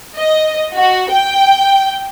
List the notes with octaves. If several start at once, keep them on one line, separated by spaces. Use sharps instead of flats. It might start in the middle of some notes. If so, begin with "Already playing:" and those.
D#5
F#4
G5